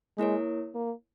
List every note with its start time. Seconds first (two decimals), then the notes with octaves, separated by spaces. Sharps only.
0.18 G#3 A#3 E4 A#4 C#5
0.75 A#3